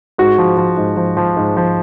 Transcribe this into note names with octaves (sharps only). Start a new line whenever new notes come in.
G#2 F#4
F3
F3
G#2
F3
F3
G#2
F3